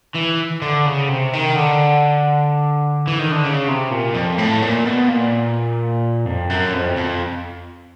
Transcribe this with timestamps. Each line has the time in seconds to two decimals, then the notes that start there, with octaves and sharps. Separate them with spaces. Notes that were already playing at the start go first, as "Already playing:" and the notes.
0.15 E3
0.62 D3
0.86 C#3
1.09 C3
1.33 D#3
1.56 D3
3.08 E3
3.19 D#3
3.31 D3
3.44 C#3
3.68 C3
3.91 A#2
4.14 F2
4.38 A2
4.62 A#2
4.85 B2
5.09 A#2
6.26 F2
6.50 F#2
6.74 F2
6.96 F2